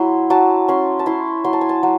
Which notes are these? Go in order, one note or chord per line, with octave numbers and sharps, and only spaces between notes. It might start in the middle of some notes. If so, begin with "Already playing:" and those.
Already playing: F#3 E4 C6
F#3 A5
C#4 C6
A5
E4 C6
F#3 C6
A5
G#5
A5
F#3